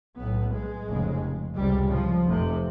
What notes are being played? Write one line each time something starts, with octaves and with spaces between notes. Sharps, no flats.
B1 A2 B3
G#3
F1 F2 C#3
C#2 C3 G3
F3
F1 F2 C3